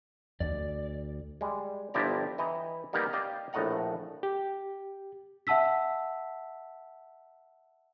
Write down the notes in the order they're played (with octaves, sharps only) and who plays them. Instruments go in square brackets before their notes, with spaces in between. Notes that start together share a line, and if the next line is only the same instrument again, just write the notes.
[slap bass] D2 [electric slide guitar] D5
[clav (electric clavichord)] G3 G#3
G1 F3 E4 G4 D5 A#5
E3 E4 D#5 G5 A#5
G3 A#3 B3 D#4 G4 A#4
G4 D5 D#5 F5
A#1 A2 A3 D#5 F#5 A#5
[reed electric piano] G4
[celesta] E5 F#5 A5 E6 B6